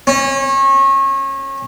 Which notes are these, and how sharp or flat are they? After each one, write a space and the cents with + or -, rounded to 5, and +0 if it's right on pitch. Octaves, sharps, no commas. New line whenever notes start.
C#4 -30